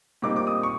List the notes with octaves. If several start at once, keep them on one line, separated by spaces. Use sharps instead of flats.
A#2 G3 C4 D#4 D6
D6
D#6
C#6